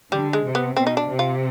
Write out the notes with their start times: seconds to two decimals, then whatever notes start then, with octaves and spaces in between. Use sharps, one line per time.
0.12 D3 G3
0.33 G#3
0.44 C3
0.55 B3
0.76 B2 C4
0.87 D#4
0.97 D4
1.07 C3
1.19 F4